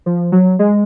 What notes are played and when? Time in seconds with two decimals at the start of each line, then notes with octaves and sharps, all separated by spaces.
0.06 F3
0.32 F#3
0.59 G#3